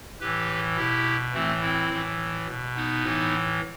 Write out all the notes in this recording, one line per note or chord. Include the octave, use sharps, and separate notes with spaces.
A2 E3 G4 B4
B2 E4 G4
A2 E3 A3 C4
C4 E4
A2 E3
B2
B3 D#4
A2 E3